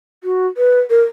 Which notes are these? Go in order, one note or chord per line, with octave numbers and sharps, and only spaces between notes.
F#4
B4
A#4